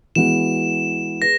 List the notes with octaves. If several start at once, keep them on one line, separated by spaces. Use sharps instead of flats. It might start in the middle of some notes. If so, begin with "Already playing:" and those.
E3 G#3 B3 F#4 E7
G#4 B4 A#6